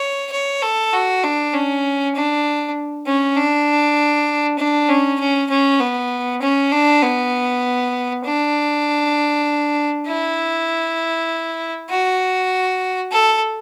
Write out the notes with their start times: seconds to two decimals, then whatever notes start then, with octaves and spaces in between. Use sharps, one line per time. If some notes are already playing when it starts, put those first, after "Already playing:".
Already playing: C#5
0.32 C#5
0.62 A4
0.93 F#4
1.23 D4
1.54 C#4
2.15 D4
3.07 C#4
3.37 D4
4.59 D4
4.89 C#4
5.20 C#4
5.50 C#4
5.80 B3
6.42 C#4
6.72 D4
7.03 B3
8.24 D4
10.07 E4
11.90 F#4
13.12 A4